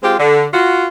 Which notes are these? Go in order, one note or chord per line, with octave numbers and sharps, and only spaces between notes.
G#3 C4 F4 G4
D3
F4 F#4